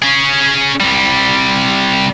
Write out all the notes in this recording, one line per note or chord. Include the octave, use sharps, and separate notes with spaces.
C#4 G#4
C2 G3